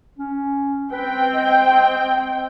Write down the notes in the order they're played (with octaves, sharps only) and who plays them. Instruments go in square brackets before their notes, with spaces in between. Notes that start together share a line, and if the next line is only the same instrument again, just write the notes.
[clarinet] C#4
[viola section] C4 G5 [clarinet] B4
[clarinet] D#5